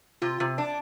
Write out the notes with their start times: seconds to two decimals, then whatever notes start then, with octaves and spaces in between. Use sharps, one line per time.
0.22 C3 F4
0.40 C3
0.58 D4